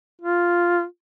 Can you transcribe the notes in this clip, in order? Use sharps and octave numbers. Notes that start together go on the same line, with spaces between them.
F4